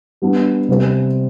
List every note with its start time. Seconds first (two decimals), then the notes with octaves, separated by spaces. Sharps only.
0.22 G3 B3 D4
0.69 C3 G3 C4